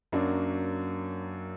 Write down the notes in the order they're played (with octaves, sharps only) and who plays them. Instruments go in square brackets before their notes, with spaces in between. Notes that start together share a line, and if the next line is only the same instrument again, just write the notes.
[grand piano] F#2 F#3 A#3 D4